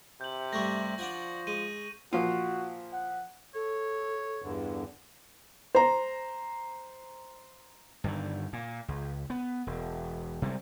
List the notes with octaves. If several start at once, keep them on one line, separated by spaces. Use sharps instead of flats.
C3 G6 F#7
G2 G3 A3 C#6 A#6
F3 D4 F#5 G#5
G#3 D#7
A#2 F3 F4 F#4
F#5
A4 C#5
E2 G2 D3
C5 A#5
G2 D3 D#3
A#2
C#2
B3
E1
C3 G3 G#3